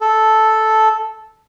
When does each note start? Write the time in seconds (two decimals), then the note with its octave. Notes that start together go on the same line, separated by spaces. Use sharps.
0.01 A4